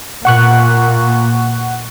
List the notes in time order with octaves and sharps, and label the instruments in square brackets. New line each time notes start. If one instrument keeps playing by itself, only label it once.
[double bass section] A#2 [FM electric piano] F#5 C#6 F#6